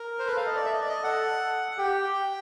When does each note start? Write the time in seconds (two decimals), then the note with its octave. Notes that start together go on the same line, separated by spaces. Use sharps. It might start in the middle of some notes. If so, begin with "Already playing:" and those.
Already playing: A#4
0.19 C5
0.27 A4 B4
0.37 F5
0.46 D#5
0.56 D5
0.65 E5
0.73 D#5
0.81 D5
0.88 D#5
1.03 A4 F#5
1.72 F#5
1.78 G4 G5